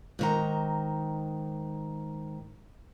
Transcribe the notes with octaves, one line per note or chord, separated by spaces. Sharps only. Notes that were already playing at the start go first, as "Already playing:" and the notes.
G#2 D#3 A#5